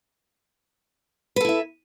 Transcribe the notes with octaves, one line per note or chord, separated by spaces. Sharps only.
E4 A4 B4 E5